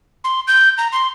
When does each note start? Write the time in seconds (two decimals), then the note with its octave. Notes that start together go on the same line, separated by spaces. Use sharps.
0.24 C6
0.48 G6
0.78 A#5
0.92 C6